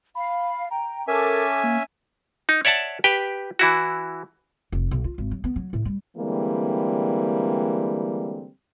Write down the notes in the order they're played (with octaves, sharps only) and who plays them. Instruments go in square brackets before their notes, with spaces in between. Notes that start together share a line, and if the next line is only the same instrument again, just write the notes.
[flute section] F5 [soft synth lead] B5
[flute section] G5 [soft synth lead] A#5
[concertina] C#4 E5 G#5 [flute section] A4 D6 [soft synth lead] A#4
[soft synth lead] A#3
[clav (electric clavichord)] D#4
C#5 D5 E5 F#5 A5
G4 B4 G5
E3 E4 F#4
[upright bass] F1
B1
F4
G#1
F#3
B3
F#3
A2
G3
[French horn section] D3 E3 G3 G#3 A#3 C4